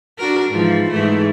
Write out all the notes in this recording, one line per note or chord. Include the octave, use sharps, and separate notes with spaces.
D4 F#4 A#4
G#2 E3 F3
G#2 E3 A3